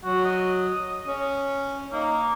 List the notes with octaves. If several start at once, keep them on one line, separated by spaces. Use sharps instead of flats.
F#3 F#4
D#5
C#4
A#3 D#4